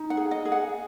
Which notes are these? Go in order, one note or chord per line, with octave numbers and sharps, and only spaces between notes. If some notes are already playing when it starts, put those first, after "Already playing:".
Already playing: D#4
F#5
G#4
D#5
G#4
F#5